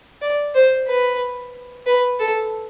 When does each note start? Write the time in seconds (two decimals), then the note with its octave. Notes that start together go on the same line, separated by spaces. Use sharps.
0.22 D5
0.55 C5
0.88 B4
1.86 B4
2.20 A4